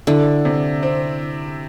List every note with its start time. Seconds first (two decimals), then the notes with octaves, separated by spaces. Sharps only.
0.07 D3 E4
0.45 C3
0.83 C4